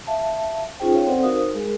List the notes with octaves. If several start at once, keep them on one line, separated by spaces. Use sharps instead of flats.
E5 F5 A5
C#4 D#4 F4 G#4 C5 G5
C#5 F5 G5
C4 A4 C5 D5 F#5
D#4 F#4 A#4 C5 F5 D#6
G#3 G#4 A#4